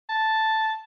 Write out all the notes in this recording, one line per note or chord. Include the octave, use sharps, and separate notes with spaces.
A5